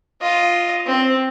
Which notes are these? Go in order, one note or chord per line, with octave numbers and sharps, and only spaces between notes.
F4 D#5
C4